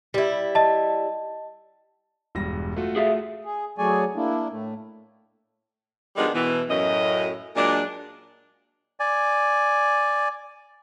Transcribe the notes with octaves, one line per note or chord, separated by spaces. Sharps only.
G3 E4
D#5 A5
E1 G2 A#6
A3 F4 F#4
G#4 E5 F5
G#4
F#3 A3 G#4 C#5 D5 G#5
A#3 D4 E4
A2 A3
D#3 F3 G3 G#3 B3 D4
B2 E3
F#2 A2 D#5
A#2 F#3 G#3 D4
D5 G#5